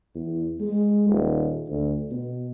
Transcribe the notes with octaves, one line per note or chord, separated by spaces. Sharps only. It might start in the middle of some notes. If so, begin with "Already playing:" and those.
E2
G#3
D#1
D2
B2